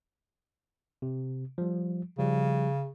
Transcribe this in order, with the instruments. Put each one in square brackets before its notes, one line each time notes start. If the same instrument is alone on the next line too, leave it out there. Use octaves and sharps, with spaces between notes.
[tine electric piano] C3
F3 G3
[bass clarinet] C#3 [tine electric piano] F3 G3